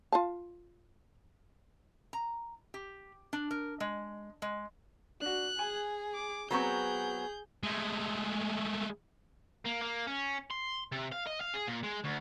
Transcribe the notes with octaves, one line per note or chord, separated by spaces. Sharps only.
F4 F5 A5
A#5
G4
D4
A#4
G#3
G#3
D4 F#4 F#6
G#4 G#5
D6
F#3 B3 C4 G#4 A#5 C#6 G6
G#3 A3
A#3
A#3
C#4
C6
C3
F5
D#5
F5
G#4
A#2
G#3
D2